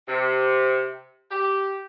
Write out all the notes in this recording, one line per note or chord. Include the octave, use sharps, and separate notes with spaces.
C3
G4